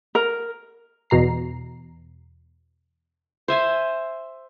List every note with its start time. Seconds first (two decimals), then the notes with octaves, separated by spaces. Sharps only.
0.15 A#4
1.10 E2 B2 A#5 C7
3.48 C5 E5 G#5